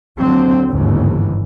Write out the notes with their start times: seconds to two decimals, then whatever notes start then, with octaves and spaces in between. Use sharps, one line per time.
0.19 D#2 D3 F#3 C4
0.71 G1 D#2 G#2 C#3 E3